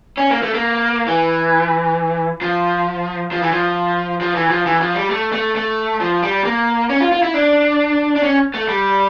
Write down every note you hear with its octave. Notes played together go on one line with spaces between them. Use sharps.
C#4
A#3
A3
A#3
E3
F3
F3
E3
F3
F3
E3
F3
E3
F3
G3
A3
A3
A3
F3
G3
A#3
C#4
F4
F4
E4
D4
D4
C#4
A3
G3